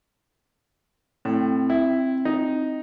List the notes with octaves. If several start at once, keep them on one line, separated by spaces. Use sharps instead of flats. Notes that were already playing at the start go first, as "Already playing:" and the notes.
A2 C4 G5
E4
D#4